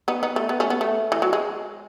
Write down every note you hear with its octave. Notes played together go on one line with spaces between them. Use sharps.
B3 D#4
B3 D#4
A3
B3
A3 C#4
B3
A3
E3
F#3
G#3